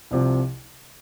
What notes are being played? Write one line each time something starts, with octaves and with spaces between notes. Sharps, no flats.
C2 C3 F3